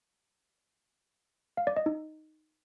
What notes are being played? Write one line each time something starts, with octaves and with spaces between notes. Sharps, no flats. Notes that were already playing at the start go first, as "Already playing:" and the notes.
F5
D5
D#5
D#4